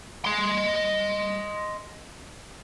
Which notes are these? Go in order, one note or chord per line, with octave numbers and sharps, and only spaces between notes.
D#5 C6